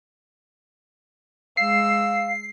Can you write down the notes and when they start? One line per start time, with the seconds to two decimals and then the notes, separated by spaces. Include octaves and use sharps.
1.57 G#3 F5 E6 C7